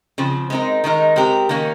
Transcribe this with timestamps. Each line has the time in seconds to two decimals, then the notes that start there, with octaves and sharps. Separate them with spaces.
0.18 C#3 F3 C4
0.50 G#3 C4 D#4 A#4
0.84 D#3 G#3 D#4 A#4
1.16 G#3 C4 G4 A#4
1.49 D#3 A#3 C#4